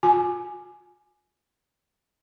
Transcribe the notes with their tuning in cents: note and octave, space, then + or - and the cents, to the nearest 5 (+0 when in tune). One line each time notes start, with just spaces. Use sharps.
F4 +40 G#5 +10